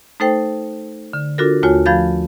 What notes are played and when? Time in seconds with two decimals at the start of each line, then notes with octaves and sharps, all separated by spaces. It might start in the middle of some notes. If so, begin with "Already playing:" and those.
0.20 A3 D#4 A4 C5 G5
1.13 D3
1.38 D4 F4 F#4 A4 A#4
1.63 D#2 A3 F4 F#4 C#5 G#5
1.86 F3 A3 F5 B5 G6 A6